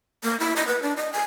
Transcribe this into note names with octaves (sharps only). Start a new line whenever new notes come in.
A#3
E4
D#5
B4
D4
D#5
G#5